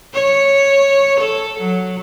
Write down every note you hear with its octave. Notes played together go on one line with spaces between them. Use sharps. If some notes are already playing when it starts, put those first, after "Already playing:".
C#5
A4
F#3